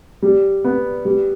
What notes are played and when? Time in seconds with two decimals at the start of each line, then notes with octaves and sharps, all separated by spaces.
0.22 G3
0.64 B3
1.05 G3